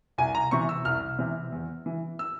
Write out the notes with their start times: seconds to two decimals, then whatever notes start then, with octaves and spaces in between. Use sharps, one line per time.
0.18 C2 G#5
0.35 A#5
0.51 C3 E3 C#6
0.69 E6
0.85 C2 F6
1.19 C3 E3
1.52 E2
1.86 E3
2.19 E6